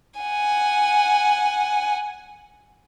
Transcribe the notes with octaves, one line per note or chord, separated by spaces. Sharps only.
F#5 G#5